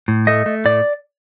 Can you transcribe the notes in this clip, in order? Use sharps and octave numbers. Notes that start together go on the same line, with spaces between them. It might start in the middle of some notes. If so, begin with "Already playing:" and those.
A2
A3 D#5
A3
A2 D5